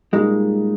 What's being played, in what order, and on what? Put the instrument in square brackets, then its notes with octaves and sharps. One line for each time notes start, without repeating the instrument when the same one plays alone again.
[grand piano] A#2 G3 A#3 D#4 [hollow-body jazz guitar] G#3